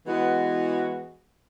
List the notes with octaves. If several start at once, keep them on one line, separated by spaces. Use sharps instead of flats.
E3 G#3 B3 F#4